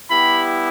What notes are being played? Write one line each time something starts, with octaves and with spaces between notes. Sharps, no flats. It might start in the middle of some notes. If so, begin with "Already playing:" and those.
G3 B3 E4 G4 B5